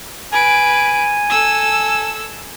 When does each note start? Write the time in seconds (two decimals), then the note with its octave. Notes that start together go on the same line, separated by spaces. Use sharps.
0.33 B4 G#5 D7
1.30 A4 E6